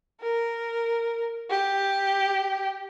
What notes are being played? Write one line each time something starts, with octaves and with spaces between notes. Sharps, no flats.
A#4
G4